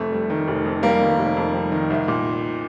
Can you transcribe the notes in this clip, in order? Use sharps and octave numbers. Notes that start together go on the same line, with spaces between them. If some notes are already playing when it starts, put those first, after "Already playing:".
Already playing: F1 F2 A3
G3
D#3
F1
F2
G3 A#3
D#3
F1
F2
G3
D#3
C2
A#2